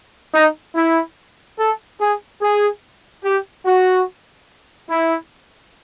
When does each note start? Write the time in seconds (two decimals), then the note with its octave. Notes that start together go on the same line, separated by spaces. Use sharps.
0.34 D#4
0.75 E4
1.58 A4
2.00 G#4
2.42 G#4
3.24 G4
3.66 F#4
4.90 E4